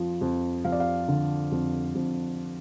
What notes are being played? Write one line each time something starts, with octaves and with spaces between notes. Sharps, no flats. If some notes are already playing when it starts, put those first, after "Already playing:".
Already playing: F2 F3
F2
F2 F5
D5
F5
D3
F2
F2